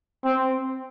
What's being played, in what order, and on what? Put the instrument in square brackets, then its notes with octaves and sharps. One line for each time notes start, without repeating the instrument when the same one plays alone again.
[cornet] C4